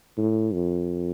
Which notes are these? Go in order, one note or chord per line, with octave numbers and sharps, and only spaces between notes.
A2
F2